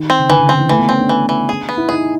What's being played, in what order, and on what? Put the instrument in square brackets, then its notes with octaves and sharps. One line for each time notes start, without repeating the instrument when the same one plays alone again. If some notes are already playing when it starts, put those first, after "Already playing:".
Already playing: [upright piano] D#3
[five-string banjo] C4
[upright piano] C#3
[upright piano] D3 [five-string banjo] E3
[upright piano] C#3
[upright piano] D3 [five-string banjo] C4
[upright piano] E3
[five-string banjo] E3 [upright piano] A3
[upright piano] B3
[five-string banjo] C4 [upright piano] C#4
[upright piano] D4
[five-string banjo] E3
E3
G#4
B3
[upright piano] E4
[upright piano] D#4 [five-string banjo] G#4